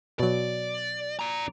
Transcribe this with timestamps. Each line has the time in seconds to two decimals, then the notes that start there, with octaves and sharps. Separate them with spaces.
0.20 B2 F#3 D5
1.19 D5 A#5